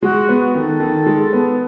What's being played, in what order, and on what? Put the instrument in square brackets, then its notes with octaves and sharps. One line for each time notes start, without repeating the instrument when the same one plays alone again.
[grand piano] G#3 [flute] F#4
[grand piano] B3
[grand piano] D#3 [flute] A4
[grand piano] D#3
G#3
B3